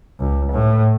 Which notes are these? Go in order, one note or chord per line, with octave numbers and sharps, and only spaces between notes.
C#2
A2